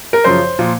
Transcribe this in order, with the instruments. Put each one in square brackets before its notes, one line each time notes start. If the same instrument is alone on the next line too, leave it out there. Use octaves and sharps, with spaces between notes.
[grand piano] A#4
F#2 C#3 F3 C5
A#2 F3